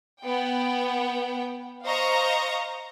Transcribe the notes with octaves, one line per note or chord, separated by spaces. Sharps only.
B3 G5
C5 D#5 F5 A#5 C#6